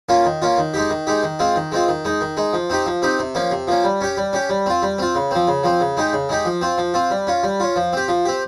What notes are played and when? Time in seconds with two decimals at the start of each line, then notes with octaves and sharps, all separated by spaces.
0.09 A#3 C#4 F4
0.25 D#3
0.42 A#3 C#4 F4
0.58 D#3
0.74 G#3 D#4 G4
0.90 D#3
1.07 G#3 D#4 G4
1.23 D#3
1.39 G#3 C4 F4
1.56 D#3
1.72 G#3 C4 F4
1.88 D#3
2.05 G#3 D#4
2.21 D#3
2.37 G#3 D#4
2.53 F3
2.70 C4 D#4 G4
2.86 F3
3.02 C4 D#4 G4
3.19 C3
3.35 F3 A#3 C#4
3.51 C3
3.68 F3 A#3 C#4
3.84 G3
4.01 C#4 G4
4.17 G3
4.33 C#4 G4
4.49 G3
4.66 C4 F4
4.82 G3
4.99 C4 F4
5.15 C#3
5.31 F3 C4
5.48 C#3
5.63 F3 C4
5.80 C#3
5.97 G#3 D#4 G4
6.13 C#3
6.29 G#3 D#4 G4
6.45 F3
6.61 C4 F4
6.78 F3
6.94 C4 F4
7.11 G3
7.27 C#4 F4
7.43 G3
7.60 C#4 F4
7.76 F3
7.93 C4 G4
8.08 F3
8.25 C4 G4